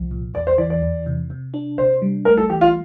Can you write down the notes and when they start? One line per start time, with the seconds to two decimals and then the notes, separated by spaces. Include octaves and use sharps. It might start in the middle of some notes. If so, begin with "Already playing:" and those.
Already playing: C2 F3
0.11 A#2
0.34 E2 D5
0.47 C5
0.58 E3 D5
0.70 D5
0.82 E2
1.06 C3
1.30 C3
1.54 D4
1.78 C3 C5
2.02 G3
2.25 A3 A#4
2.37 A4
2.50 E3 G4
2.61 F4